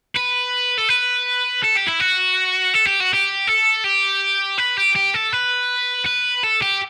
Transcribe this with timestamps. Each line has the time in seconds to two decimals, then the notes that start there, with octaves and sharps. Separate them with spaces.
0.15 B4
0.78 A4
0.89 B4
1.63 A4
1.75 G4
1.88 E4
2.00 F#4
2.74 A4
2.86 G4
3.00 F#4
3.13 G4
3.47 A4
3.84 G4
4.58 B4
4.77 G4
4.95 G4
5.14 A4
5.32 B4
6.06 B4
6.43 A4
6.61 G4